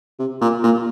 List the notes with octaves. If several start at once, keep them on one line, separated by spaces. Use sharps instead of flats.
C3
A#2
A#2